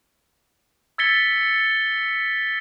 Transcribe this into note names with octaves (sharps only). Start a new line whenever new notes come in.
E6 G#6 A6 B6 C#7 G7